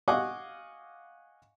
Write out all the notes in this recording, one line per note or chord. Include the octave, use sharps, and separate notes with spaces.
D#5 F5 F#5 G#5 C#6 D6